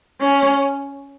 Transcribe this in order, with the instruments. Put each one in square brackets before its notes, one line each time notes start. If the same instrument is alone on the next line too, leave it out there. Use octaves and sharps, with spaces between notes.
[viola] C#4